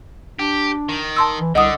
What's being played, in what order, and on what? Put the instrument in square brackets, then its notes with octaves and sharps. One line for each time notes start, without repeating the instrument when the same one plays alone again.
[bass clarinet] D4 [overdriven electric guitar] G4
[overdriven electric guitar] D#3
[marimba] A5 C6 E6
[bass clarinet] E3
[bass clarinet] C2 [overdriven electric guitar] D3 [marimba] D#5 F#5 D#6